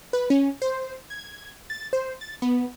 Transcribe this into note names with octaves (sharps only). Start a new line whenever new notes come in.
B4
C#4
C5
G#6
A6
C5
A6
B3